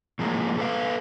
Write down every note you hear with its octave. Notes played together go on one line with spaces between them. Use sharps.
A2 F3 G#3 A#3
A4 B4 F5